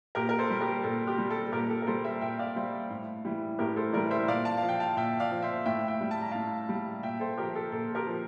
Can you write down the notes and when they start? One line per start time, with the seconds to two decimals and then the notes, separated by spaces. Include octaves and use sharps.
0.15 A#2 G4 A#4
0.29 A#4
0.38 A4 C5
0.50 G3
0.61 G4 A#4
0.84 A#2 A4
1.07 G4
1.18 G3
1.30 A4
1.47 A4
1.52 A#2 G4 A#4
1.70 A4
1.82 A#4
1.87 G3 A4 C5
2.04 C5 E5
2.21 A#2 E5 G5
2.39 D5 F5
2.56 G3 C5 E5
2.90 A2
3.25 E3 G3
3.59 A2 G4 A#4
3.76 A4 C5
3.93 E3 G3 A#4 D5
4.10 C5 E5
4.28 A#2 D5 F5
4.45 F5 A5
4.57 F5
4.63 F3
4.69 G5
4.80 F5 A5
4.96 A#2 E5 G5
5.20 D5 F5
5.32 F3
5.42 C5 E5
5.66 A2 E5 G5
5.88 E5 G5
6.01 G3
6.11 A5
6.21 A#5
6.31 A2 F5 A5
6.69 G3
7.03 A#2 E5 G5
7.20 A4 C5
7.38 F3 G4 A#4
7.55 A4
7.71 A#2 A4
7.95 G4 A#4
8.07 F3